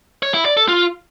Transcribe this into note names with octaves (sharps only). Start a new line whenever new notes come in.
C#5
E4
D5
A4
F4